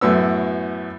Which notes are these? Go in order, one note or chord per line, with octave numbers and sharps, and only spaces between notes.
F#2 A2 B3 E6